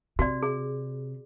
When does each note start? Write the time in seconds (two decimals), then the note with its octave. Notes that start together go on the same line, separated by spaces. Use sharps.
0.19 C3 F#4 D5
0.43 G#4